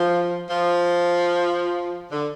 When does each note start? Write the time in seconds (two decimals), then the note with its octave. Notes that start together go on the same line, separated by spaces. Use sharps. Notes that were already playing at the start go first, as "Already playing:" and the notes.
Already playing: F3
0.50 F3
2.12 D3